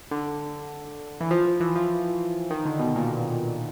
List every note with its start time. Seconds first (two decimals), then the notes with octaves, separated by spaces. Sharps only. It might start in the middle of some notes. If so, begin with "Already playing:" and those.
0.11 D3
1.21 E3
1.31 F3
1.46 F3
1.60 E3
1.76 F3
2.51 D#3
2.65 D3
2.80 B2
2.96 A#2